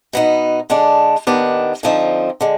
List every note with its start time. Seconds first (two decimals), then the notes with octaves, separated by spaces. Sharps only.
0.13 B2 B3 D#4
0.70 D3 G#3 D4
1.27 D#2 D#3 B3 D4
1.83 D3 F3 C4 D#4
2.41 D3 G#3